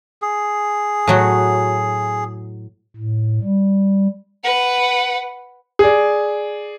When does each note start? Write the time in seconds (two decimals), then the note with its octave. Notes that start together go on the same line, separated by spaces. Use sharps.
0.22 G#4
1.07 A2 F#3 F#4
2.96 A2
3.43 G3
4.43 B4 F#5
5.79 G#4 D5